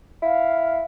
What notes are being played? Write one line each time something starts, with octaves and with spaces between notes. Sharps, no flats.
E4 F5